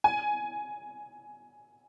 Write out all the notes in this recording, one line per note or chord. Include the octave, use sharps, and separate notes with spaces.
G#5